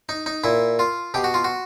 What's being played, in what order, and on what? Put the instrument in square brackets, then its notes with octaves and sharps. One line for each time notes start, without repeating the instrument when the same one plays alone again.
[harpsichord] D#4
D#4
A#2 E4
F4
B2 G4
F#4
F4
F#4